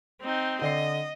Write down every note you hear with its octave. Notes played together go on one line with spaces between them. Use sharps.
C4 D#4
D3 D5 D#5 C7